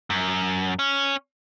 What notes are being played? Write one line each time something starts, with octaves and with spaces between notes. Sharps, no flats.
F#2
C#4